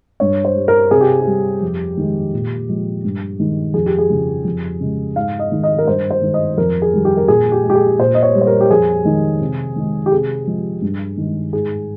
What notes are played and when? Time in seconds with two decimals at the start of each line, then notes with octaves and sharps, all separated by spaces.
0.20 G2 C#5
0.45 C5
0.56 G3
0.68 A#4
0.91 C3 G#4
1.01 G4
1.21 G4
1.27 G3
1.62 F2
1.97 D#3 G#3
2.33 A#2
2.69 F3 G#3
3.04 G2
3.39 D#3 G#3
3.74 F2 G#4
3.86 G4
3.98 G#4
4.10 C#3 F3
4.45 F2
4.80 C#3 G#3
5.16 G#2 F5
5.39 D#5
5.52 D#3 G#3
5.63 D#5
5.78 A#4
5.87 G2 C5
6.11 C5
6.22 D#3 G#3
6.34 D#5
6.57 F2 A#4
6.82 G#4
6.93 D#3 G3
7.05 G4
7.17 A#4
7.28 A#2 G#4
7.52 G4
7.63 G#3
7.70 G4
7.75 G#4
7.99 A#2 C5
8.14 D#5
8.23 C#5
8.35 G3
8.41 C5
8.47 A#4
8.61 G4
8.70 F2 G#4
9.05 D#3 G#3
9.41 C3
9.76 D#3 G#3
10.06 G4
10.12 C3 G#4
10.47 F3 G#3
10.82 G2
11.17 D#3 G#3
11.53 G#2 G#4